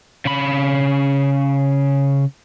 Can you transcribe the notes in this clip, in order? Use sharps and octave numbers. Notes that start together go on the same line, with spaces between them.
C#3 B5